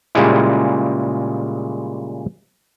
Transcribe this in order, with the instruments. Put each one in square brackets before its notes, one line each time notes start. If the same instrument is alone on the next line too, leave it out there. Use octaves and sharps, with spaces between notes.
[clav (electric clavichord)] A#2 C#3 G3 G#3 E4